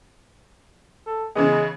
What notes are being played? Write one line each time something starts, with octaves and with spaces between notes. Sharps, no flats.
A4
C#3 E3 G#3 B3